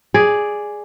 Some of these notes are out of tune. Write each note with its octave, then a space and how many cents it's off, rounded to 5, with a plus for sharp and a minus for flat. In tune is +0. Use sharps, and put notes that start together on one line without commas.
G#4 +0 D5 +0